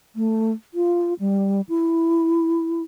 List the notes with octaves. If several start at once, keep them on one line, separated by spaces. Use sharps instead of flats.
A3
F4
G3
E4